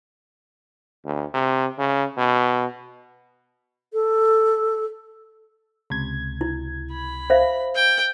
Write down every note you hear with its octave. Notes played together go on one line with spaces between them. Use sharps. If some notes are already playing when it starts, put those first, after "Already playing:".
D2
C3
C#3
B2
A4
C#2 C3 G#6
E4
B5
C5 E5 F5
G5